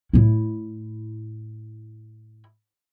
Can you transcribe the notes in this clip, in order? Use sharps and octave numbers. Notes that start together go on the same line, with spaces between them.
A2 E4